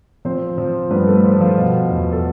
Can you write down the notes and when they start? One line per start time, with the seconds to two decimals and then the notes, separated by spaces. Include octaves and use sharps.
0.25 F3 C4 C5
0.58 F3
0.91 G2 B3 B4
1.07 A3 A4
1.24 F3 F4
1.41 F3 F4
1.57 B2
1.90 E2
2.13 A4